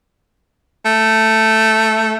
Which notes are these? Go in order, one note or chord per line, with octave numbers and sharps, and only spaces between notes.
A3